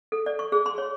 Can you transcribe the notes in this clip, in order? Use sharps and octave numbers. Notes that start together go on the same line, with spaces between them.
A4
D5
C#6
G#4
C6
C#5